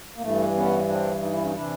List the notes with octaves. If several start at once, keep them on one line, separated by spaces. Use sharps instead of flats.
A#3
G2 E3 A3
B3 C#4
C4 D4
D#4
E4
C#4 D#4
C3 E3 D4 E4